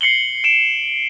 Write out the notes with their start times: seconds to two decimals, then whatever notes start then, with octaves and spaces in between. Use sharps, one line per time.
0.01 C7 C#7 F#7 G7
0.44 D7 E7